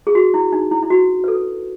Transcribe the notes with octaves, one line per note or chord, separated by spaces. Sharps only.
G#4
F#4
E4
D#4
E4
E4
F#4
B4
A4